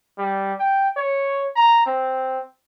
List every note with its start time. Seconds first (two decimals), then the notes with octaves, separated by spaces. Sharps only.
0.18 G3
0.59 G5
0.97 C#5
1.56 A#5
1.86 C4